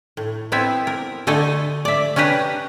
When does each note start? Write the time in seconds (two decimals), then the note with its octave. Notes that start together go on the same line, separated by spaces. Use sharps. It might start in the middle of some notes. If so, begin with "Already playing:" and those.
0.17 A2
0.52 B3 C4 E4 E5
0.87 A#4
1.27 D3 A3 A4 D#5 G#5 A5
1.85 D5 E5
2.16 C#4 D4 G4 B4 A#5